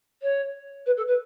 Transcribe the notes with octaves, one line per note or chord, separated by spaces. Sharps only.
C#5
B4
A4
B4